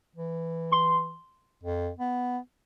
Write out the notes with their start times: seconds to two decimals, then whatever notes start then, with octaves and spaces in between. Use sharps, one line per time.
0.16 E3
0.72 C6
1.63 F2
1.99 B3